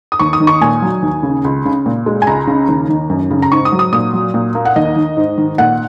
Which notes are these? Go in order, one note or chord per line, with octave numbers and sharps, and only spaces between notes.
D#6
D#2 C#6
D#6
D#3
C#6
A#2 G#5
F#3
D#2
C#3
C#2
C#3
A#2
G#3
G#5
C#2 A#5
C#3
D#2
D#3
F#2
C#3
A#5
G#2 C#6
D#6
F#3
D#6
A#2 D#6
F#3
A#2
A#3
F#5
D#2 D#5
D#3
G#2
D#3
A#2 F#5